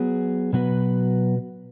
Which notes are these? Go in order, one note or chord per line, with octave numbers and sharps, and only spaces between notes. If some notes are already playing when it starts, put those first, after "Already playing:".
Already playing: F#3 B3 G#4
B2 F#3 B3 F#4 B4